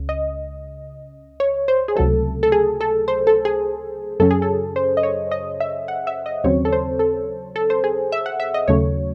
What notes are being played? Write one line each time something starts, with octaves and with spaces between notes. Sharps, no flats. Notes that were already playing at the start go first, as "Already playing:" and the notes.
Already playing: C#2 C#3
D#5
C#5
C5
G#4
C#2 C3 F#3 A3 A4
A4
G#4
A4
C5
A4
G#4
F#2 C#3 F#3 C#4 A4
G#4
A4
C5
D#5
C#5
D#5
E5
F#5
E5
D#5
D#2 C#3 F#3 C4 C#5
A4
C5
A4
A4
C5
G#4
E5
F#5
E5
D#5
D#2 C#3 F#3 A3 C#5